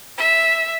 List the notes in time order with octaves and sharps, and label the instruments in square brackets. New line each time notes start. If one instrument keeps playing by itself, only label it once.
[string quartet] E5